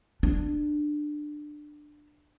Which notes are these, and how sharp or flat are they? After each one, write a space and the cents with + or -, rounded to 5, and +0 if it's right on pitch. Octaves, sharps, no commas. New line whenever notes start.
D4 +15